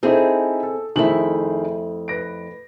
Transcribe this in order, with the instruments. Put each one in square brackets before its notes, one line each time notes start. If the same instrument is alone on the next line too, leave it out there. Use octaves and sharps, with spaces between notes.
[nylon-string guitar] C4 G#4 [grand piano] D#4 E4 A4
[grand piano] A4
[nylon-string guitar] F2 A3 E4 [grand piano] D#3 G#4 F#7
[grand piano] B4 A#6 D7